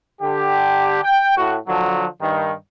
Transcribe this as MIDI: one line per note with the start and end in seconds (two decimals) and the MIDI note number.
0.21 0.99 50
0.21 0.99 67
1.03 1.33 79
1.37 1.56 45
1.37 1.56 66
1.68 2.06 50
1.68 2.06 53
1.68 2.06 54
2.20 2.52 43
2.20 2.52 51